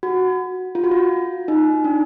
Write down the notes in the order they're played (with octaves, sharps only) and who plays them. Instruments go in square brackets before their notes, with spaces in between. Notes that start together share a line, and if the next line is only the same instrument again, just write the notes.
[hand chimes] F#4
F4
F#4
F4
D#4
D4